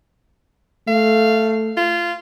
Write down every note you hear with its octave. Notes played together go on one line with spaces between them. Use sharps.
A3 F5
F4